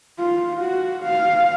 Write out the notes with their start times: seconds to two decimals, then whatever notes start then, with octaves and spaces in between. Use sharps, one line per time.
0.19 F4
0.61 F#4
1.03 F5